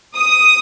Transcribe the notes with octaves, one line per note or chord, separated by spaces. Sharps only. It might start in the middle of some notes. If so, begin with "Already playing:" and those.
D#6